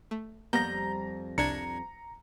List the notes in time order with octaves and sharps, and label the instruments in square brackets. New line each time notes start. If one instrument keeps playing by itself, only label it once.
[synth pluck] A3
[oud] F2 G3 [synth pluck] A#3 B3 G4 [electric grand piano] A#5 A#6 [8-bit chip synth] G6
[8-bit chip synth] C2 D4 G#6 [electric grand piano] A#5 C#7